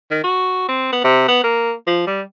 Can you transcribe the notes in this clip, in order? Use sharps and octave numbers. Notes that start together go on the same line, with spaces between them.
D#3
F#4
C4
B3
C3
B3
A#3
F3
G3